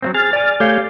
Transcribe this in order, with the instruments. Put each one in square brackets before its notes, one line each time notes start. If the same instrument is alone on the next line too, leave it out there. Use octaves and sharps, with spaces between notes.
[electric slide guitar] F#3 A#3 C4
[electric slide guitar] G#4 [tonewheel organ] F6 A6
[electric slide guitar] D5 G#5
[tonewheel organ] A3 G6 [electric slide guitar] G4 C#5 F5